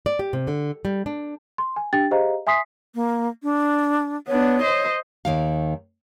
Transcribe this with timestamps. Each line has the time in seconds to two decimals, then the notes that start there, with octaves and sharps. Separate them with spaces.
0.06 D5
0.19 G4
0.33 C3
0.47 D3
0.85 G3
1.06 D4
1.58 C6
1.76 G#5
1.93 D4 G4 G5 A6
2.11 G4 G#4 C5 D#5 F5 A#5
2.47 E5 G#5 C6 D#6 B6 C7
2.95 A#3
3.43 D4
4.28 B3 D4 C#5
4.62 C5 D#5
5.25 D#2 D#3 F5